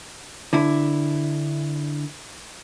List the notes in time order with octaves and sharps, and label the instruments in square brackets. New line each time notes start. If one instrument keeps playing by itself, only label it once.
[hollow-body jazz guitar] D3 E4